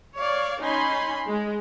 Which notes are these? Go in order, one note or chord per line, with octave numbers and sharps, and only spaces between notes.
C#5 D5 F5
C#4 D#4 G#5 B5 C6
G#3